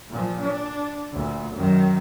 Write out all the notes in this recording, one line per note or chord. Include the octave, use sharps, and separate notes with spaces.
A#2 F3
D4
D2 A#2
F#2 D#3